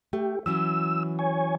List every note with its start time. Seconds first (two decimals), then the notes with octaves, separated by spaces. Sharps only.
0.13 A3 G4
0.46 E3 F#3 C#4 E6
1.19 C#5 G#5